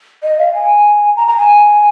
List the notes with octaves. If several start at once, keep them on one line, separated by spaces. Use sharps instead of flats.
D#5
F5
G#5
A#5
A#5
G#5